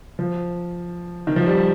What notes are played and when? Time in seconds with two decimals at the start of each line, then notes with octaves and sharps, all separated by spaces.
0.19 F3
1.27 D#3
1.36 F3
1.46 G3